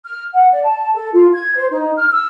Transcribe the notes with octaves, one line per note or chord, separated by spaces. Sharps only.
F6
F#5
D5
A5
A4
F4
G#6
C5
D#4
F6
E6